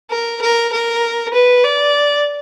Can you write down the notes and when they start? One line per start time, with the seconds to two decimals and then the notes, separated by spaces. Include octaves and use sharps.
0.10 A#4
0.41 A#4
0.72 A#4
1.33 B4
1.64 D5